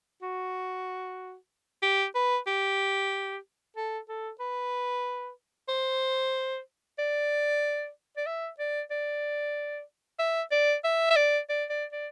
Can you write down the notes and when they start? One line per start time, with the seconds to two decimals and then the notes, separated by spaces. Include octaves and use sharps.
0.22 F#4
1.83 G4
2.15 B4
2.47 G4
3.77 A4
4.09 A4
4.40 B4
5.69 C5
6.99 D5
8.17 D5
8.26 E5
8.59 D5
8.91 D5
10.19 E5
10.52 D5
10.84 E5
11.11 E5
11.16 D5
11.49 D5
11.70 D5
11.92 D5